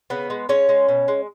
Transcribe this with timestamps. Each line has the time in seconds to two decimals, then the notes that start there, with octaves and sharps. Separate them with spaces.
0.10 C#3 B3 B4
0.30 G#3
0.49 G#3 C#4 C#5
0.69 G#3
0.89 B2
1.08 G#3